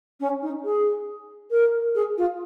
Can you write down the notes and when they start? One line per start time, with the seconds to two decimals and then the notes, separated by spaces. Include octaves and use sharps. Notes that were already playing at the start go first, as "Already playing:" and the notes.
0.20 C#4
0.42 D#4
0.64 G#4
1.51 A#4
1.95 G#4
2.17 F4